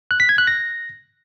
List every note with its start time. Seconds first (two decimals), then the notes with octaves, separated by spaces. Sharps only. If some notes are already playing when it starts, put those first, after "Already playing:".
0.11 F#6
0.20 B6
0.29 G#6
0.38 F#6
0.47 A#6